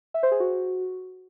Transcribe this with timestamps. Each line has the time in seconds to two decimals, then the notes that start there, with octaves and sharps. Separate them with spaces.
0.14 E5
0.23 C5
0.31 G#4
0.40 F#4